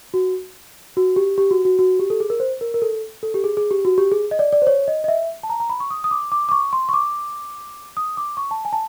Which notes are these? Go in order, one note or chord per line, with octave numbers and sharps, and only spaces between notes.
F#4
F#4
G4
G4
F#4
F#4
F#4
G4
A4
G#4
A#4
C5
A#4
A#4
A4
A4
G4
G#4
G#4
G4
F#4
G4
G#4
D#5
D5
D5
C5
C#5
D#5
D#5
E5
A5
A#5
A#5
B5
C#6
D#6
D#6
D6
D6
D6
C#6
C6
C#6
D6
D#6
D6
C#6
A5
G#5
A5